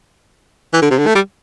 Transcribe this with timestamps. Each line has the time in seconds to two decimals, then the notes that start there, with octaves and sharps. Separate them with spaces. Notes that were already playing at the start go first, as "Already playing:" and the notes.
0.73 E3
0.82 D3
0.91 C3
0.98 D3
1.07 A3
1.15 G3